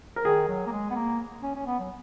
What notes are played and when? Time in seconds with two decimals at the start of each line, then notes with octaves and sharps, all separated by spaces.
0.16 A#4
0.25 D#3 G#4
0.48 F#3
0.66 A#3
0.72 G#3
0.90 B3
0.95 A#3
1.43 C#4
1.55 C#4
1.66 B3
1.79 F#3